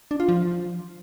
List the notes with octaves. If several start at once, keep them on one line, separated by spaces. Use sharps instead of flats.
D4
F4
F3